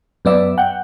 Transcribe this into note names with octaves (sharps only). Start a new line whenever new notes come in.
F#2 B3 D5 E5
F#5 G5